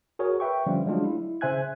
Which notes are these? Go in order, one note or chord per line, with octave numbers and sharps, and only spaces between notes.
F#4 G#4 A#4 C#5
B4 E5 G5 C#6
D3 F3 G3 C#4 F4
F#3 G#3 A3 D4 F4
E4
C#3 C5 E5 G#5 F#6 G#6